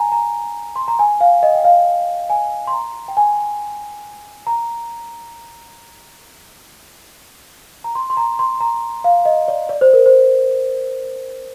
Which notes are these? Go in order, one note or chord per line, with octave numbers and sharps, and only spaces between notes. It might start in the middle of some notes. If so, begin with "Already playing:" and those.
Already playing: G#5 A#5
A#5
C6
A#5
G#5
F5
D#5
G5
F5
G#5
C6
A#5
G5
G#5
A#5
A#5
C6
C6
A#5
C6
A#5
F5
D#5
D5
D5
C5
A#4
C5